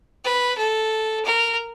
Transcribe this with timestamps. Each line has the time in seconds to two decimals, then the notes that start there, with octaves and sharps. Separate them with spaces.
0.24 B4
0.58 A4
1.25 A#4